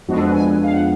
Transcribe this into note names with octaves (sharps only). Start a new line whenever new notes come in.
F2 F3 G#3 B3 D4 F#4
A4
B4
G#5
F5
F#5